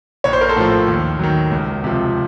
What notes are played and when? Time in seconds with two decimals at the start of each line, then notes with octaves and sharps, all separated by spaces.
0.24 A#1 C#5
0.33 C5
0.41 A#4
0.49 A4 C5
0.56 A2 F3
0.88 D#2
1.19 D#3 F#3
1.51 C#2
1.84 C3 F3